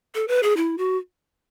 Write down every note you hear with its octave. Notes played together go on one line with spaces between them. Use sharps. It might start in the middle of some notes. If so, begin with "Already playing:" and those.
A4
B4
G#4
E4
F#4